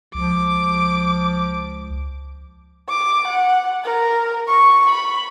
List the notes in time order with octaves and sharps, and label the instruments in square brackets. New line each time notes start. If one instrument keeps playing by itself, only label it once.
[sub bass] C#2 [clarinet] F3 [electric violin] D6
[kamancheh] D6
F#5
A#4
C#6
B5